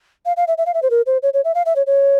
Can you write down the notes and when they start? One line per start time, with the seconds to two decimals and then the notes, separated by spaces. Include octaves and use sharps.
0.26 F5
0.37 F5
0.48 E5
0.58 E5
0.66 F5
0.74 E5
0.83 C5
0.90 A#4
1.06 C5
1.23 C#5
1.34 C#5
1.44 E5
1.55 F5
1.66 E5
1.76 C#5
1.87 C#5